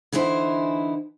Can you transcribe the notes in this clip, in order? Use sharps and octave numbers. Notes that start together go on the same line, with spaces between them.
D3 E3 D#4 E4 C5